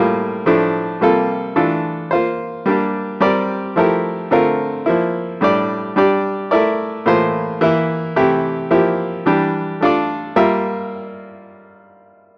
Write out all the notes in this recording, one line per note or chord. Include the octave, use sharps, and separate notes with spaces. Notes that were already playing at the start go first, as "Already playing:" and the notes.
Already playing: A2 G3 A#3 F4
A2 F3 A3 D4
C3 G3 A#3 F4 A4
E3 A3 D4 F4 A4
A#3 F4 C5
G3 A#3 D4 G4
G3 C4 G4 A#4 D5
F3 A3 E4 G4 A#4
D3 A3 C4 F4 A#4
F3 A#3 E4
A2 G3 D4 G4 D5
G3 D4 G4 D5
A3 E4 A#4 D5
A2 E3 A#3 F4 C5
E3 A#3 E4
C3 E3 A3 E4 G4
F3 A#3 E4 G4
E3 G3 D4 G4
A3 D4 F4 A4 D5
G3 A#3 F4 A#4 E5